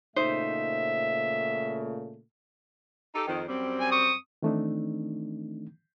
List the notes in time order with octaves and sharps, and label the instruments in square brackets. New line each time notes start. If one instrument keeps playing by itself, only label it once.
[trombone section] A#2 C#3 A3 [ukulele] D#4 C5 [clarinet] E5
[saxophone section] D#4 G4 A4
F2 D#3
F#2 G3 C4
[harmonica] G#5
C#6 D#6
[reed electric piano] D#3 E3 A3 C4 D4 D#4